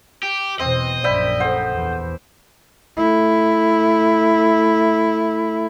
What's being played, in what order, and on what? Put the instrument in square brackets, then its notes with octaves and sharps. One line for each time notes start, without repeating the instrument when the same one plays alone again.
[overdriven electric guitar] G4
[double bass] E2 B2 [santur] C4 [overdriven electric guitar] D#5
[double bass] A#1 F#2 [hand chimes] D5 [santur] E5 G5 B5
[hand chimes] A4 F#5 [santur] C5
[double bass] E2
A3 E4